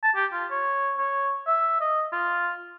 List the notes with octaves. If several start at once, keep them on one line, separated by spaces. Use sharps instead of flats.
A5
G4
F4
C#5
C#5
E5
D#5
F4